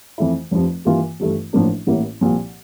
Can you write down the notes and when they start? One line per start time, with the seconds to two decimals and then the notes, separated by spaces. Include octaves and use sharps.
0.18 F2 E3 A3 E4
0.51 F1 F2 C3 F3
0.85 G2 E3 A#3 F4
1.20 G1 G2 E3 A3
1.53 A1 A2 F3 A#3 D4
1.87 A1 A2 G3 A#3 E4
2.21 C2 A#2 F3